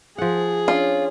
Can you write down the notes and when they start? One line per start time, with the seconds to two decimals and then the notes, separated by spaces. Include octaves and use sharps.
0.18 F3 G#4 F#5
0.68 C#4 D4 F4